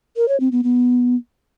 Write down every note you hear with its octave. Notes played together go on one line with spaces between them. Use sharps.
A#4
C#5
C4
B3
B3